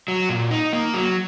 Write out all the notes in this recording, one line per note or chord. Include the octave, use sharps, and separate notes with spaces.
F#3
A#2
D#4
A#3
F#3